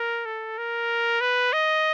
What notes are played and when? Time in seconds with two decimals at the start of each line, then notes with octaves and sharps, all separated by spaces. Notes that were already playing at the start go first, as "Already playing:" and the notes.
Already playing: A#4
0.25 A4
0.58 A#4
1.21 B4
1.53 D#5